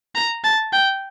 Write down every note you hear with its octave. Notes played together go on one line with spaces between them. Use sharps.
A#5
A5
G5